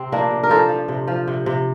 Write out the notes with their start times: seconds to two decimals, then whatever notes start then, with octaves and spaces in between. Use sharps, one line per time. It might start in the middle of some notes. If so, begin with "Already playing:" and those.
Already playing: C3 C4
0.12 F3 A#3 D4
0.31 C3
0.43 A#4
0.50 F3 A4 C5
0.69 F3
0.88 C3
1.07 F3
1.27 C3
1.46 C3